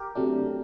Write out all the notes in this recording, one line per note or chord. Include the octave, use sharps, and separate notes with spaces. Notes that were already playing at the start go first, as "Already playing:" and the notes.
Already playing: G4 A#4
C3 F#3 A3 D4